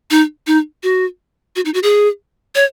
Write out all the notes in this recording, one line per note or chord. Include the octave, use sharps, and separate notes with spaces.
D#4
D#4
F#4
F#4
D#4
F#4
G#4
C#5